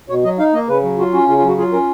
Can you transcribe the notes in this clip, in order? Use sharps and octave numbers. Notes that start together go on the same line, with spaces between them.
B2 C#5
F#3 D#5
D#4 F5
A#3 D#5
C#3 B4
F#3
F4 F#4
C#4 F#4
C#3 F4
F4
F#3 F#4
F4 G#4
C#4 A#4